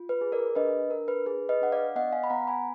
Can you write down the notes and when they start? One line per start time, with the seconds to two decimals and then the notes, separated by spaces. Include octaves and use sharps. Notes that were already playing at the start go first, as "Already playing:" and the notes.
Already playing: F4
0.09 B4
0.21 G#4
0.32 A#4 D5
0.55 D4 B4 D#5
0.91 D4 A#4
1.08 B4
1.26 G#4 B4
1.49 B4 D#5
1.61 D4 F#5
1.72 D5 F5
1.95 B3 D#5 F#5
2.13 F5 G#5
2.24 B5
2.30 B3 F#5 A#5
2.48 G#5 B5